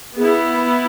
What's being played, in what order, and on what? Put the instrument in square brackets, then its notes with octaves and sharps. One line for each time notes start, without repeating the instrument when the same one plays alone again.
[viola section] B3 E4 [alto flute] G#4